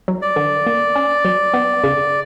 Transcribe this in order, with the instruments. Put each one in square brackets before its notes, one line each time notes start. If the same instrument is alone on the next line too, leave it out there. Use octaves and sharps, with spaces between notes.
[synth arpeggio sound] F#3
[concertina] D5
[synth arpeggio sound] D3
A#3
C#4
F#3
B3
C#3